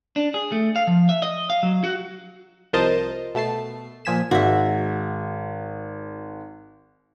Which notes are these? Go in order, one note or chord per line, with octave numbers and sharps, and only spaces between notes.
D4
G#4
A3
F5
F3
E5
D#5
F5
F#3
F#4
C2 F3 A#4 C5 D#5 A5
B2 A3 A5 C7
A#2 F3 G#5 B6 E7
G#1 G#3 F#4 E5